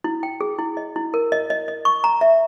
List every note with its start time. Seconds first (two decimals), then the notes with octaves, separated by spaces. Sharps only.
0.04 E4
0.23 G5
0.41 G#4
0.59 E4
0.77 D#5
0.96 E4
1.14 A#4
1.32 D#5
1.50 D#5
1.68 D#5
1.85 C#6
2.04 A#5
2.21 E5